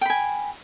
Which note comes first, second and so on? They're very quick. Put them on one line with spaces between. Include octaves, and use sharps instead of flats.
G5 B5 G#5